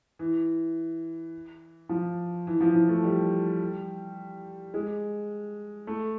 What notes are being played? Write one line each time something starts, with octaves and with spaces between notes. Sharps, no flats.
E3
F3
E3
F3
F3
A3
G3
G#3
A3